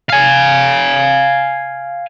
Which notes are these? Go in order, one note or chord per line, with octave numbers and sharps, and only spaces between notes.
F5 G#5